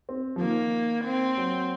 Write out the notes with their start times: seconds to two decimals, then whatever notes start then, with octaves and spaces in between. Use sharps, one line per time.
0.09 C4
0.36 F3
0.41 D#3 A#3
1.05 C4
1.37 F#3